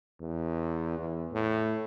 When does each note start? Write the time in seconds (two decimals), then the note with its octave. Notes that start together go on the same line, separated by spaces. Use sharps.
0.21 E2
0.98 E2
1.32 A2